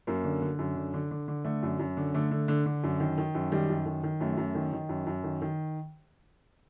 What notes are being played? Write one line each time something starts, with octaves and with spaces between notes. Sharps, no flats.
F#2 A#3
D3
D3
F#2
D3
D3
D3
D3
D3 A3
F#2
F#2
D3
D3 A3
D3
D3
D3
F#2
D#3
D#3
F#2
D#3 G3
F#2
D#3
D#3
F#2 A3
F#2
D#3
D#3
F#2
F#2
D#3
D#3